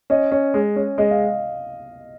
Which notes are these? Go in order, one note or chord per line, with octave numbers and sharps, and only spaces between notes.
C#4 D#5
C#4
G#3
C#4
G#3 D#5
F5